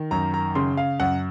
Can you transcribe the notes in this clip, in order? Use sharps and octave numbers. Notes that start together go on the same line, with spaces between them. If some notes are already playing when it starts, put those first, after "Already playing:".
Already playing: D#3
F#2 A#5
A#5
C#3 C6
F5
F#2 F#5